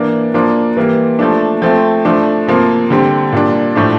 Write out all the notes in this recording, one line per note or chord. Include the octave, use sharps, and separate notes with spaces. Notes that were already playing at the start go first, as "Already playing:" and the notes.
Already playing: E3 A#3 D4
F3 A#3 D4
E3 G3 A#3
F3 A3 D4
F3 A3 C4
F3 A3 D4
C3 F3 A#3
D3 G3 C4
A#2 G3 D4
A2 F3 A3 D4